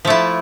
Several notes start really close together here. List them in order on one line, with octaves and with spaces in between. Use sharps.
F3 A3 E4